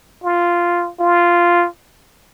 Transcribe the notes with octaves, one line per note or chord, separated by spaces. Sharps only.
F4
F4